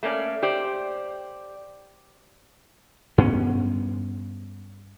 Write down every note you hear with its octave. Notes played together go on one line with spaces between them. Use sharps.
A3 A#3 C#4 D5
G4 C5 D5
G2 B3 C#4